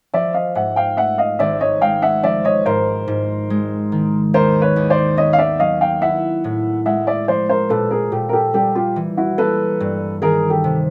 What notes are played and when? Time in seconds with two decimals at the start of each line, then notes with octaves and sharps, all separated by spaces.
0.13 F3 D5 E5
0.34 D#5 F5
0.55 G#2 E5 F#5
0.76 F5 G5
0.97 A3 E5 F#5
1.18 D#5 F5
1.39 G#1 D5 E5
1.60 C#5 D#5
1.81 G#3 F5 G5
2.02 E5 F#5
2.23 F3 D5 E5
2.45 C#5 D#5
2.65 G#2 A#4 C5
3.08 G#2
3.50 G#3
3.92 D#3
4.34 D#2 A#4 C5
4.62 B4 C#5
4.76 D#2
4.90 C5 D5
5.17 B3 C#5 D#5
5.33 F5
5.39 D5 E5
5.59 F#3 D#5 F5
5.81 F5 G5
6.02 E4 E5 F#5
6.44 A2
6.86 G#3 E5 F#5
7.07 D5 E5
7.28 F3 C5 D5
7.49 A#4 C5
7.70 A#2 A4 B4
7.91 G#4 A#4
8.11 A#2 G4 A4
8.29 A#4
8.33 G4 A4
8.54 G3 G4 A4
8.75 F4 G4
8.96 E3
9.17 E4 F#4
9.38 A#3 A4 B4
9.80 G2
10.22 D#3 G#4 A#4
10.50 G4 A4
10.64 C3